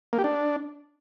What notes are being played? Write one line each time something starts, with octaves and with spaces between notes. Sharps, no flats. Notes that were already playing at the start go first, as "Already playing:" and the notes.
A#3
G4
D4